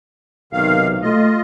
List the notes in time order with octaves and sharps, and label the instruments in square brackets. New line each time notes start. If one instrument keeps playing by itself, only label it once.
[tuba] B1 [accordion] C3 D#3 F5
[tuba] A3 [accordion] F4 D#5